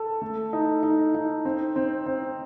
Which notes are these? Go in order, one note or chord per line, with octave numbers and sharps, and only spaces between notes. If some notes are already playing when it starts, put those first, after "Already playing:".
Already playing: A4
A3
D#4
D#4
D#4
C4
C4
C4